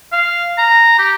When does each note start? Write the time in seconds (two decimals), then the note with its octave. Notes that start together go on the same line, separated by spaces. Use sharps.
0.12 F5
0.58 A#5
0.98 G4